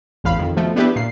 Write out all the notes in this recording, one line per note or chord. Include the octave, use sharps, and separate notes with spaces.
A1 E2 F5 B5
F2 D#3
B2 F3 A3
B3 D4 E4 G4 B4
A#2 C7